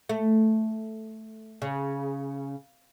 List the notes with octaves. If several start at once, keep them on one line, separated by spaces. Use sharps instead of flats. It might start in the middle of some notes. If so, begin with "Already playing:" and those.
A3
C#3